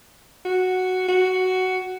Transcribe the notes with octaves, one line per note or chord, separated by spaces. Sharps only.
F#4
F#4